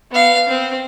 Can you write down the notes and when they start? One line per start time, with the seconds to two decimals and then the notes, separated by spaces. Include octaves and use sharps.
0.11 B3 F5
0.49 C4